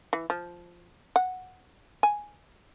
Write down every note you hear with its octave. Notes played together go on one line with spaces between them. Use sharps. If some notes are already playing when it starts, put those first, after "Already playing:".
E3
F3
F#5
G#5